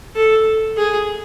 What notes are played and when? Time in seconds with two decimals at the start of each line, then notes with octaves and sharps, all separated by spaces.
0.16 A4
0.77 G#4